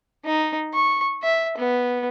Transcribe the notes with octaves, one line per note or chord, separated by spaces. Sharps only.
D#4
C#6
E5
B3